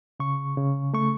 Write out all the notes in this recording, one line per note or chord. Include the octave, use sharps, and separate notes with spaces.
C#3 C#6
C#3
A3 C#6